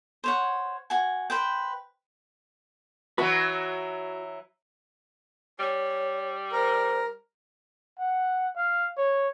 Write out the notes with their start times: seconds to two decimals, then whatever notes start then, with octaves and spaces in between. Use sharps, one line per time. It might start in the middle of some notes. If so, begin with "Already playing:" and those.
0.24 C5 C#5 F#5
0.90 F#4 G#5
1.30 B4 C5 G5
3.18 E3 F#3 F#4 B4
5.59 G3 C#5
6.52 A#4 C5
7.99 F#5
8.56 F5
8.97 C#5